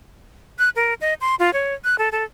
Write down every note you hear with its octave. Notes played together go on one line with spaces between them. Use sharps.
F#6
A#4
D#5
C6
F4
C#5
F#6
A4
A4